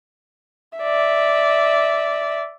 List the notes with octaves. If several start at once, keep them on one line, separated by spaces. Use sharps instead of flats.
D5 E5